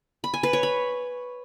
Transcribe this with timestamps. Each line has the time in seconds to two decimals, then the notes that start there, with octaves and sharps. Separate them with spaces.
0.24 B5
0.34 G#5
0.43 B4
0.53 C#5
0.63 B5